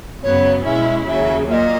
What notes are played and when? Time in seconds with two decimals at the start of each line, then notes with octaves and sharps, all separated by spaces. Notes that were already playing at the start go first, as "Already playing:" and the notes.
0.22 F#2 C#3 F#3 B3 C#5
0.65 B2 G#3 C#4 E4 E5
1.07 D#2 C#3 F#3 E5
1.49 A#2 E5
1.53 D#5